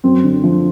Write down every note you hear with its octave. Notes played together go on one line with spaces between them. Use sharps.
F#2 C4
D3
F3